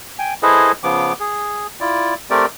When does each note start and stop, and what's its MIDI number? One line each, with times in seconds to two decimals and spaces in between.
0.19 0.34 79
0.19 0.34 80
0.43 0.72 64
0.43 0.72 68
0.43 0.72 69
0.43 0.72 71
0.43 0.72 72
0.43 0.72 75
0.83 1.13 49
0.83 1.13 53
0.83 1.13 59
0.83 1.13 86
1.20 1.67 68
1.81 2.14 64
1.81 2.14 65
1.81 2.14 74
2.30 2.46 57
2.30 2.46 60
2.30 2.46 67
2.30 2.46 70
2.30 2.46 74